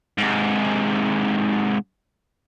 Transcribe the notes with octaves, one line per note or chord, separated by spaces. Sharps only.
G#2 C3